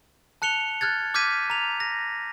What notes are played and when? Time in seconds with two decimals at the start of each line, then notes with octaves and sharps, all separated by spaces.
0.42 A5 F#6 C#7 F7 G7
0.81 F6 F#6 G#6 A6
1.14 D6 F6 G6 G#6 B6 D#7
1.50 A#5 F7
1.80 A#6